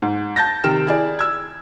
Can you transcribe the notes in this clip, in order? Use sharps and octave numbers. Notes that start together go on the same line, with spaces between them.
G#2
A5 G6 A6 A#6
C3 D#3 G5 F6 E7
E4 G#4 D5
E6 G#6